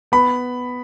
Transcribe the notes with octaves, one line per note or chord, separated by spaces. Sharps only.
B3 B5